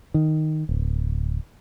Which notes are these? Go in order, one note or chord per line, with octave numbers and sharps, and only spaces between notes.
D#3
D1